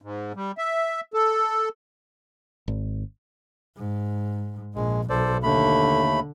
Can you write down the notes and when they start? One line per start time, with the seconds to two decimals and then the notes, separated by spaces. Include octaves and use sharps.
0.02 G#2
0.36 G3
0.58 E5
1.14 A4
2.68 G#1
3.76 G#2
4.75 A#1 G#3
5.10 B1 A4 C5 D5
5.43 D#2 D3 A3 B5